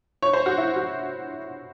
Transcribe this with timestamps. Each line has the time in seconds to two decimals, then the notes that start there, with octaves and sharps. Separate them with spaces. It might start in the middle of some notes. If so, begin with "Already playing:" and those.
0.22 C#5
0.33 C5
0.46 F#4
0.58 E4
0.76 F#4